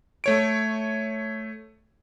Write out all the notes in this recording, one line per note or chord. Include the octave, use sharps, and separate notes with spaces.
A3 C#5 D7